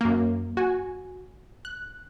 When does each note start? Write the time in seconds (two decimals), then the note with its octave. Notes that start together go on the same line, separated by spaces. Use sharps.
0.01 F#2 A#3
0.57 F#4 G#5
1.65 F#6